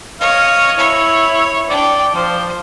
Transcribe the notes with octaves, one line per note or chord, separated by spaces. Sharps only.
C#5 D#5 F5
E4 C#5
D4 D5 G5
F3 C5